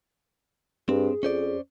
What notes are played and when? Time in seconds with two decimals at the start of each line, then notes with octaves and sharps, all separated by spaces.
0.89 G2 C4 G#4
1.23 F2 C#4 C5 D5